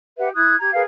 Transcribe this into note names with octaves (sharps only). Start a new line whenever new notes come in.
G4 B4 E5 F#5
E4 D#6 F#6 G#6
G4 A#5 G#6
G#4 A#4 B4 F5